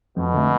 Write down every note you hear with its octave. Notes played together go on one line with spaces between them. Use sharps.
F2 B2
D3 A3